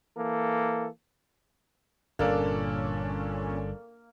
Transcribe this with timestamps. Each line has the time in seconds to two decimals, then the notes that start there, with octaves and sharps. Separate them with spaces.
0.18 E3 A#3 A4
2.19 G1 A#2 A#3 C#4 D4 A4 D5